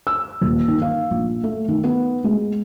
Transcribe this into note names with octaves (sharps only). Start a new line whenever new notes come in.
E6
D#1
D#3
F5
A#1
A3
D#3
B3
G#3